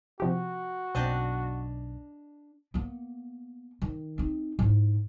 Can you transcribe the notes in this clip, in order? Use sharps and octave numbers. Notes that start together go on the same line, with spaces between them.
C3 F3 F#4 G4
B1 F#2 B2 C4 D4 D#5 G5 G6
A#3 B3
D#3
C4 D#4
G#2 E4